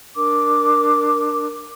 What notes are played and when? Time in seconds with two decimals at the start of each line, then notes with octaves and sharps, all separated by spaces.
0.16 D4 A#4 D6